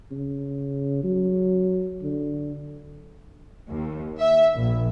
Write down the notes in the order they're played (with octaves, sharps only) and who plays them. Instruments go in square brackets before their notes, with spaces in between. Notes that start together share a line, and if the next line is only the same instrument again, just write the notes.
[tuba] C#3
F#3
D3
[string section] D#2
E5
A#1